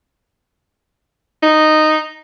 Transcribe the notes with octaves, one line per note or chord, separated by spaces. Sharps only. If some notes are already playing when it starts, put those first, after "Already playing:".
D#4